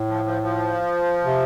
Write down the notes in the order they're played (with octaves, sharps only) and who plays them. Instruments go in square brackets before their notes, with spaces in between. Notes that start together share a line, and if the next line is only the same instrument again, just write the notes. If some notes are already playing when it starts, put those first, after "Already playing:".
Already playing: [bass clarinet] A2
[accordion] F3
F3
F3
[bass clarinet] C3